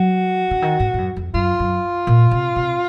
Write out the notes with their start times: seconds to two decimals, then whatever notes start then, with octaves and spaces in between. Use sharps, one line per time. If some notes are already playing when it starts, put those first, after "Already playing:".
Already playing: F#3 F#4
0.51 C#3
0.62 D#3
0.80 G#2
0.94 G#2
0.98 F#2
1.16 F2
1.34 F#2 F4
1.60 F#2
2.07 A#2
2.31 C3
2.56 C3